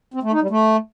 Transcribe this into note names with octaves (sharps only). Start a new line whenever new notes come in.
C4
A3
D#4
G3
A3